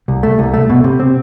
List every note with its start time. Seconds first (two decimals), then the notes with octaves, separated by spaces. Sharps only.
0.08 C2
0.23 A3
0.39 C2
0.54 A3
0.69 B2
0.84 C3
1.00 C4